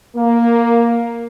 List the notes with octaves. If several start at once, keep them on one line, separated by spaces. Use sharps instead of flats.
A#3